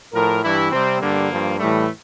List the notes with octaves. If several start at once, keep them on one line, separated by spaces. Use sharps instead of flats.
A2 F3 A#4
G2 E3 G3 E4
C3 G3 C4
G2 D3 G3 A#3
G2 F3
A2 E3 G3 A3